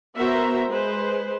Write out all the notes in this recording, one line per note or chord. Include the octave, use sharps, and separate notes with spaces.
B3 F#4 A#4 C5 E5 A#5
G#3 B4 C5